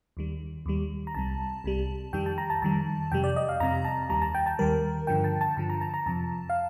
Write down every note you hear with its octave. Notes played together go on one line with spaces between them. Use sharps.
D#2 D#3 G3
D#2 D#3 G3
A#5
C2 C3 G3 A5
C2 C3 G3
F2 D#3 G3 G5
A5
A#5
A5
F2 D#3 G3 A5
F2 C3 G3 G5
D5
D#5
F5
F2 C3 G3 A#5
A5
D#2 D#3 G3 A#5
A5
G5
A5
D#2 D#3 G3 A#4
G2 D3 F3 G5
A5
A5
G2 D3 F3 A5
A#5
A5
A#5
F2 C3 F3 A5
F5